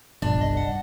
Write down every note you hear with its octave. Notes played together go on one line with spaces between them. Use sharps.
G1 C2 A#2 D4
D#5
G2 F#5